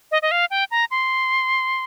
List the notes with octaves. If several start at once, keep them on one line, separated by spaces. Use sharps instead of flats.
D#5
D#5
F5
G5
A#5
C6